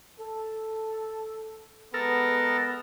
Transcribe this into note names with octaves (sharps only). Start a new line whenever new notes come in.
A4
G#3 B3 A4 A#4